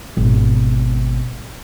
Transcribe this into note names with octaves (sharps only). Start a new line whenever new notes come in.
G#1 B2